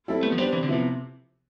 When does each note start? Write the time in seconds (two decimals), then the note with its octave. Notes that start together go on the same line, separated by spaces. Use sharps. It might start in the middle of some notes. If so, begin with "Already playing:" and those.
0.08 G3 C4 E4 A4
0.23 A3 B3
0.32 F3
0.38 G3 D4 G4 C5
0.53 C3 E3
0.63 D3
0.68 C3 F3 B3 E4